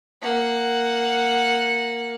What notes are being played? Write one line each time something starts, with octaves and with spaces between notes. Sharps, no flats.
A#3 F#5